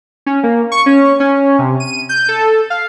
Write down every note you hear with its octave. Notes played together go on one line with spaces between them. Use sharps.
C#4
A#3
C#6
C#4
C#4
C3
D#7
G6
A4
F5